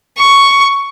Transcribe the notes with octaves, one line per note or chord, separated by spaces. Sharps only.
C#6